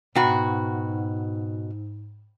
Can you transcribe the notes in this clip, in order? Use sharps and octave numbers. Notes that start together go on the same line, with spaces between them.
G#2 B2 F#4 G5 A#5 B5